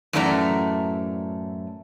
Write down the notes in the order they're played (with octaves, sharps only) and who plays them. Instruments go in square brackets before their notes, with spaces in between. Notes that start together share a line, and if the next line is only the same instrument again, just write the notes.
[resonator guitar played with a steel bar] F#2 A2 E3 A3 D5 A#5